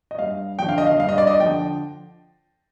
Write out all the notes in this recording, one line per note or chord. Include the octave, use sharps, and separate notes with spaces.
D#5
G2 F5
D3 F3 G5
F5
D#5
F5
G2 F5
D#5
D5
D#5
D3 F3 G5